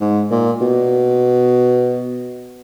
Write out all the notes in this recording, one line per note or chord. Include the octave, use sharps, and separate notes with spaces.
G#2
A#2
B2